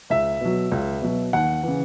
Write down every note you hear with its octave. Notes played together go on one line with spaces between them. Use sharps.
C#2 E5
B2 F#3
C#2
B2 F#3
D#2 F#5
C#3 E3